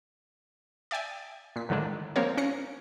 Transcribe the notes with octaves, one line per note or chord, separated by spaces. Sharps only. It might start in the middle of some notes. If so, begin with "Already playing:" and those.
D5 E5 G5 G#5
A#2 B6
A2 D3 D#3 G#3 D4
F3 G3 A#3 C4 A#4 C#5
C#4 F#6 A#6 C7 C#7